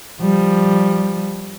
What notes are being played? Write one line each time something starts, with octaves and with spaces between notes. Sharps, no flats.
F3 G3